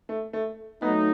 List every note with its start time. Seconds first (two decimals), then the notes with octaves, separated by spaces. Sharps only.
0.09 A3
0.33 A3
0.82 F#3 A3 B3 D#4